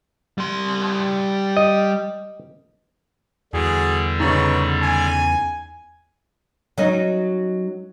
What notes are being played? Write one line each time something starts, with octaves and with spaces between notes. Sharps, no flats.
G3 C6
D#5
E2 D3 G3 F#4 G#4
G#2 C#3 D#4 B4 C#5
G#5
F#3 C#4 D#4